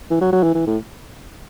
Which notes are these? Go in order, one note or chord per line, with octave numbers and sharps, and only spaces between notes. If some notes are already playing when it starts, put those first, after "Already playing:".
E3
F#3
F#3
E3
E3
A2